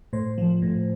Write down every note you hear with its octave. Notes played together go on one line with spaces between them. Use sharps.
A2 C5
F3
A2